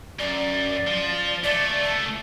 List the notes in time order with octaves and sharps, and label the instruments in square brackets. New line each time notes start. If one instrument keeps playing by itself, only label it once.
[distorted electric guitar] F#2 [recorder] D5
[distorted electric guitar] F3
[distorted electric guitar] C#2 A3 [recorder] D5
[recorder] A5